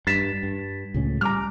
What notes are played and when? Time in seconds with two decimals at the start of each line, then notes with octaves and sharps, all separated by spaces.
0.07 G2 A6 B6 E7
0.43 G2
0.94 C#2 A2 C#4
1.21 G3 A#5 D6 F6